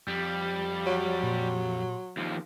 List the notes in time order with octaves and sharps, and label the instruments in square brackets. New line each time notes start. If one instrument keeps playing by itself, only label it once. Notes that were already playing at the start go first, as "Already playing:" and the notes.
[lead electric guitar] F2 [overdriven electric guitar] G3
[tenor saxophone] F#3 [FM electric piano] C#5
[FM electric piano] A#2 G4 C6
[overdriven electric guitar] D#2 F3